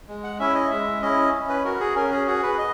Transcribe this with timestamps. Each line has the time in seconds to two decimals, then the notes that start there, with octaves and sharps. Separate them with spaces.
0.08 G#3
0.24 F#5
0.39 C#4 E4 E5
0.55 D#5
0.71 G#3 E5
1.02 C#4 E4 D#5
1.33 C#4
1.49 B4
1.64 F#4 A#4
1.80 G#4
1.96 C#4 A#4
2.11 G#4
2.27 F#4 G#4
2.43 B4
2.58 D#5